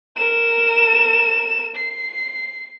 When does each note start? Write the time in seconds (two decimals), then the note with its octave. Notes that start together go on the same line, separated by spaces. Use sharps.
0.16 A#4 E7
1.75 C7